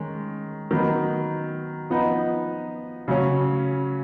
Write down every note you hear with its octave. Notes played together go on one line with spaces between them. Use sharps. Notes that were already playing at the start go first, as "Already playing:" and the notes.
Already playing: D#3 G#3 C#4
D#3 F#3 B3 D#4
F3 B3 D#4
C#3 F#3 C#4